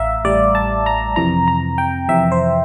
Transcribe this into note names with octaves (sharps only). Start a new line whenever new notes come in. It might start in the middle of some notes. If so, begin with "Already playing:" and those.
Already playing: A1 A2 E5 F5 A#5
A1 A2 G3 D5
A5
A#5
F2 C3 E3 A#5
A#5
G5
F2 C3 E3 E5
C5